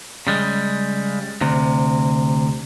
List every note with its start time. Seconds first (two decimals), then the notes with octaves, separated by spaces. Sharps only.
0.27 C#3 G3 G#3
1.41 D2 C3